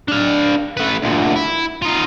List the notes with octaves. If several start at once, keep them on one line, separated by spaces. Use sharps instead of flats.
D4 F5
A3 B4
D2 A#2
E4
D#4 F4